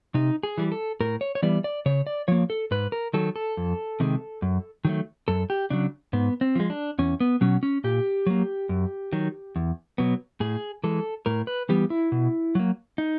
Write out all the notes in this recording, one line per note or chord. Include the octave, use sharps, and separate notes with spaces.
C3 D#4
G#4
E3 G3
A4
A2 A#4
C#5
C#5
E3 G3 B3 D5
D5
C#3 C#5
D5
F3 A#3 C#5
A4
G#2 B4
A#4
D#3 F#3 A4
A4
F2
C3 D#3 G#3
F#2
D#3 F#3 A3
F#2 A4
G4
C#3 F#3 D4
G#2 B3
C4
F3 G#3
D4
E2 C#4
B3
B2 F#3 C#4
C#4
A#2 G4
F#3 A#3
F#2
D#3 F#3
E2
B2 F#3 B3
A2 G#4
E3 G#3 A4
A2 A#4
B4
E3 G3 B3 G4
E4
B2
F#3 A#3
D#4